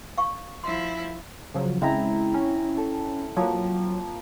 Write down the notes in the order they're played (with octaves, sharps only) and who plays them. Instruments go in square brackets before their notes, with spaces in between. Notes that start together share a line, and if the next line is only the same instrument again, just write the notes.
[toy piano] F5 C#6
[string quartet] F3 E4 [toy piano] C6
[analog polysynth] C#3 F3 F#3
[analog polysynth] C#3 G#3 [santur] C4 E4 A#5
[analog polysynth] C#4
[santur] A4
[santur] F3 A#3 [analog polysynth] F#3